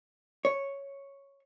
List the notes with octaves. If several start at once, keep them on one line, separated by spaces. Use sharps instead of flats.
C#5